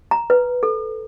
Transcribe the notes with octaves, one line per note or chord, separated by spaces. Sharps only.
A#5
B4
A4